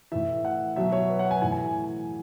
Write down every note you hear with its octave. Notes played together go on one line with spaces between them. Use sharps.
A2 E3 E5
F#5
B2 F#3 E5
C#5
B4
F#5
G#5
A2 E3 G#5
G#5